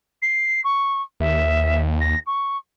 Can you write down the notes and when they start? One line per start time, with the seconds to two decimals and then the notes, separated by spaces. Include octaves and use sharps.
0.22 C7
0.64 C#6
1.20 D#2 E5
2.00 A#6
2.26 C#6